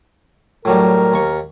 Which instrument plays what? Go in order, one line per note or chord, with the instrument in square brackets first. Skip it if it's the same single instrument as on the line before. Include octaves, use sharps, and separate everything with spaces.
[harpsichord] A2 F#3 G3 [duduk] A#4
[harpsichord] D#2 C#6